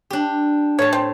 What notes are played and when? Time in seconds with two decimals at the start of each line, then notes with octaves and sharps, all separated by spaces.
0.10 D4 G4
0.79 A2 C#5 A5
0.93 C4